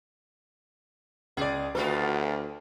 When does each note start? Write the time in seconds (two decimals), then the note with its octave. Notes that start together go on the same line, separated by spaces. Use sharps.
1.37 C#2 G#4 D5
1.75 D2 B3 F4 F#4 A4 B4